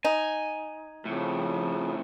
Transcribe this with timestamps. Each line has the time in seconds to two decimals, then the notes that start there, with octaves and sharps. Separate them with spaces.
0.05 D#4 G#5
1.05 F2 A2 C#3 F3